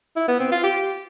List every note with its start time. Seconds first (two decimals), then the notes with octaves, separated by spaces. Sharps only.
0.16 E4
0.28 B3
0.40 C4
0.52 F4
0.64 G4